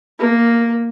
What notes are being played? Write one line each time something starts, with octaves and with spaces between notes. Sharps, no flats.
A#3